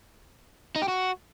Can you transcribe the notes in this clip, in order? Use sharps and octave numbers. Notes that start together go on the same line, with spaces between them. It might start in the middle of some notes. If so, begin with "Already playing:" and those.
D#4
G4
F#4